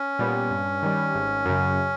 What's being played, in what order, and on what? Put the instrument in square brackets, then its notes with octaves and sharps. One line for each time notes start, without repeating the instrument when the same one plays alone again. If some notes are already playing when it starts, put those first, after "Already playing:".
Already playing: [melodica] C#4
[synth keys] A#2 G3 B3
G2
D#3 G3
G#1
F#2 C#3